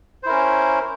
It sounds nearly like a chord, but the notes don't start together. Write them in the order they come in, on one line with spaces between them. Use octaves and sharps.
C5 E4 A#4 C#4